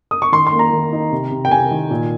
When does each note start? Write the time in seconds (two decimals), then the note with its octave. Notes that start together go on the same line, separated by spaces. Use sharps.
0.11 D#6
0.22 C#6
0.32 D#3 C6
0.47 C6
0.53 A#3
0.59 A#5
0.73 D#3
0.93 D#4
1.12 C3
1.31 C3
1.45 G5
1.51 C3 G#5
1.71 D#3
1.91 A#2